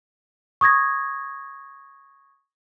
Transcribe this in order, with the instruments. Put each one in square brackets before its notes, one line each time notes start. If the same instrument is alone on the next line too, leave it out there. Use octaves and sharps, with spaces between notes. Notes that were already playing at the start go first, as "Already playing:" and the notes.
[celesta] C#6 D#6 G#6 A#6